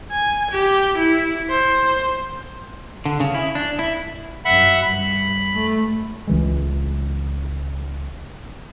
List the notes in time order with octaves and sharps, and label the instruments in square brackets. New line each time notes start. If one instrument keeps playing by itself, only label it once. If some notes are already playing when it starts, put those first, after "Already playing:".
[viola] G#5
G4
E4
C5
[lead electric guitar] D3
C#3
E4
D4
E4
[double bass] F#2 [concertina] E5 F#5 B5
[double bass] G2 [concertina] B5
[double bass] A3
[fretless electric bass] C#2 E3 G#3